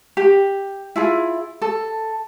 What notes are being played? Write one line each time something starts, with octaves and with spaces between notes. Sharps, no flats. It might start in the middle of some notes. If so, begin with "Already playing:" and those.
G4
E4 F4 G#4
A4